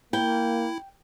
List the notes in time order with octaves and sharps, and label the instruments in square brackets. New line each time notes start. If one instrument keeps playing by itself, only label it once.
[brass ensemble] A#3 [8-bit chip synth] E4 [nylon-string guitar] G5